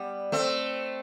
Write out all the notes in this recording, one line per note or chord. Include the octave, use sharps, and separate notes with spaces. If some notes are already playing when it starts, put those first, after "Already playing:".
Already playing: G3 B3
A3 C4